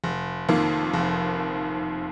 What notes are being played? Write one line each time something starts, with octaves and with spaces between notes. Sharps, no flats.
F1
F2 D#3 A#3
F1